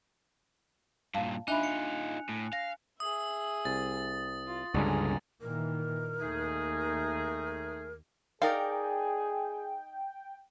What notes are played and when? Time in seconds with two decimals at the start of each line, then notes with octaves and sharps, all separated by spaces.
1.14 G2 A#2 F5 A5
1.48 D4 D#4 F4 E5 G#5 B5 F#6 F7
1.63 C#7
2.29 A2
2.53 F5 A#6
3.00 G#4 E5 D#6
3.65 C2 A6
4.46 F4
4.74 C#2 G2 D3 G#3 C#4 G#5 A#5
5.41 A#2 D#3 E3 A#4
6.21 D#2 A3 D#4 G#4
8.42 D#4 G#4 A#4 D5 F5 G5